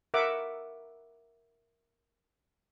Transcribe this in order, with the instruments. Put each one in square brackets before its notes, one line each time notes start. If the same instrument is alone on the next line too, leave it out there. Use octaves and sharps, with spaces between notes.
[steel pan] A#4 E5 F#5 D6